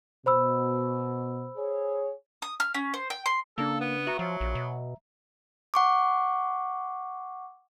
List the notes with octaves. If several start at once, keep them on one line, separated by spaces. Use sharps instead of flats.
B2 C5 B5 E6
G#4 C#5
D#6
F6
C#4
C5
G5
C6
C#3 A#3 D4 A4
B3
F#4 E5 A#5
F3 F#3
A#1
B2
F#5 C#6 D6